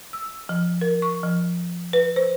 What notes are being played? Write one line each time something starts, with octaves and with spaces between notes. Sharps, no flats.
E6
F3
A#4
C#6
F3
B4
C5